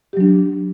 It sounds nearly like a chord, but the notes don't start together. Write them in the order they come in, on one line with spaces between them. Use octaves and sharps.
G4 F#3 D4